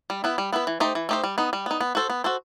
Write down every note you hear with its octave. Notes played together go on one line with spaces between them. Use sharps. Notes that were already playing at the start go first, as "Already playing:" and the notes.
G3
B3 E4 B4
G3
B3 E4 B4
E3
A3 D#4 G4 C5
E3
A3 D#4 G4 C5
G3
B3 D#4
G3
B3 D#4
B3
F#4 A4 C5
B3
F#4 A4 C5